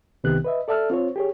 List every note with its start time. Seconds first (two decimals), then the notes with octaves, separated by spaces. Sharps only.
0.24 C2 C3 D#3 B3 G4 F#6
0.45 B4 D#5 E5
0.68 A4 D5 E5 A5 E6 F6
0.90 C4 F4 C5 C#5
1.16 G4 G#4 C#5